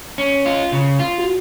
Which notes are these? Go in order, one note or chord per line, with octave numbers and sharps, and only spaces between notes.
C#4
F4
C#3
F4
F#4